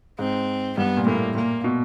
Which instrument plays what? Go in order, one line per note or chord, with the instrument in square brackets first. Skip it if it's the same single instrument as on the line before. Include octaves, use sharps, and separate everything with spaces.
[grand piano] G#2 [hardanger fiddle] C4
[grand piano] G2 [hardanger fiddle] B3
[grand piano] A#2
[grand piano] A2 [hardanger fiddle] A#3
[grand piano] A#2 [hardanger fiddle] A#3
[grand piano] B2